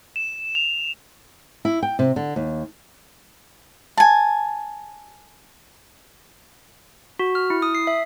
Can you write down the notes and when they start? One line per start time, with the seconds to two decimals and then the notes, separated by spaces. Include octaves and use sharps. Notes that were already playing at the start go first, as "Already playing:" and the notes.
0.16 E7
0.55 F7
1.65 E4
1.83 G5
1.99 C3
2.16 D3
2.36 D#2
3.97 G#5 A5
7.19 F#4
7.35 F6
7.50 E4
7.62 D#6
7.75 C7
7.87 E5